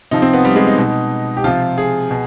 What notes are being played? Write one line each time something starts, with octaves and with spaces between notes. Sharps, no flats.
C3 F3 D#4
C4
B3
G3
G#3
D#4
B2
G4
C3 F3 F4
G#4
B2